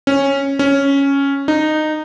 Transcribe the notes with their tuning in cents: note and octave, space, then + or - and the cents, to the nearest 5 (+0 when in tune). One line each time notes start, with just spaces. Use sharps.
C#4 -10
C#4 +0
D#4 -15